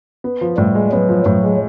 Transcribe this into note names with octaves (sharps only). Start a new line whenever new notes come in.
B3
F3
A2 G3
G#3
F#3 B3
F3
A2 F#3
G#3